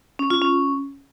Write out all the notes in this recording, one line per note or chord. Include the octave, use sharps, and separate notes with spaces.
C#4
F4
C#4